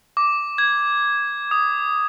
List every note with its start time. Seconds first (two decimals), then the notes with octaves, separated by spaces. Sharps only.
0.17 D6
0.58 G#6
1.51 D#6